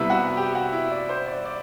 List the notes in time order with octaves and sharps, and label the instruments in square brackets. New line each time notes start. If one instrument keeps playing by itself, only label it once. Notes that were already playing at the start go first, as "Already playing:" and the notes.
Already playing: [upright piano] C3 G3 B3 E4 E5
F#4 F#5
G4 G5
F#4 F#5
E4 E5
D5
C5
D5
D5